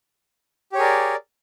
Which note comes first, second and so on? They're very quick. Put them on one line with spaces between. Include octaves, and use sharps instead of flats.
G4 C#5 G#4 A#4 D5